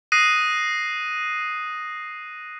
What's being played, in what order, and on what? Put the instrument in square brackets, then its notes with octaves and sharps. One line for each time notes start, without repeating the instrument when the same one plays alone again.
[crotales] D#6 F#6 A#6 C7 D#7